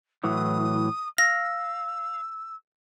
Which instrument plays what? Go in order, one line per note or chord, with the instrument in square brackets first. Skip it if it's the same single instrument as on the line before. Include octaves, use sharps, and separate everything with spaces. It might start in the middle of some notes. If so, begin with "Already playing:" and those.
[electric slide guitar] A2 E3 F#3 [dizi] D#6
[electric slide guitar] F5 [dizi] E6 [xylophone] A#6